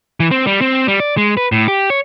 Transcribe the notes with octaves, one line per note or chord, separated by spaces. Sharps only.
E3
C4
G3
C4
G3
D5
G#3
B4
A2
G4
C#5